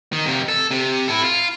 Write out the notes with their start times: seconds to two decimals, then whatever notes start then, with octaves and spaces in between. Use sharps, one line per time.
0.13 D#3
0.26 F2 C3
0.49 A4
0.71 C3
1.08 E4 A4
1.24 F4